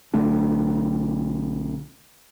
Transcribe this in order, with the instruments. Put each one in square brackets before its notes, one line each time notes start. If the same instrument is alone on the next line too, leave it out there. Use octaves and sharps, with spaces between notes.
[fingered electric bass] B1 D3 A3 D4